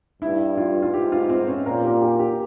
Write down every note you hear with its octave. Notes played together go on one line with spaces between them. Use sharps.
G2 E4
F4
F4
G#2 G4
F4
C4
C#4
A#2 A#4
G4
G4
G4